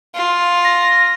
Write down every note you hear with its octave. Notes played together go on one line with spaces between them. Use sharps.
F4
A#6